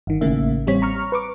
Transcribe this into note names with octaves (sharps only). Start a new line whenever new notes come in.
G1 D#3
A1 A2 C#3 A#3 E5
A1 G3 C4 C#5 B6
A#5 C#6 F6
B4 C#6 D6